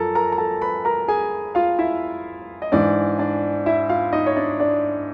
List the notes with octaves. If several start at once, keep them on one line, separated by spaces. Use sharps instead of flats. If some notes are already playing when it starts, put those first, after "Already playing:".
Already playing: F#2 F3 A4 A#4 A5
A#4 A#5
A#5
A4 A5
B4 B5
A#4 A#5
G#4 G#5
F4 F5
E4 E5
D#5
G#2 E3 D4 D5
D4 D5
E4 E5
F4 F5
D#4 D#5
C#5
D4 D5
D4 D5